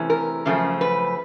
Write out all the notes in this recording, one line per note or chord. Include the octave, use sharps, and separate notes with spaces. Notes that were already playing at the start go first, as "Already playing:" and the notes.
Already playing: C3 E3 A3 C#4
A#4
F#2 C#3 F3 A3
B4